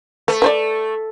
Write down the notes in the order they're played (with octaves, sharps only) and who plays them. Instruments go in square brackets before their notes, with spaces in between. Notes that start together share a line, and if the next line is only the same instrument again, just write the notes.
[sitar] A3 [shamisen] B4
[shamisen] B4 C5 D5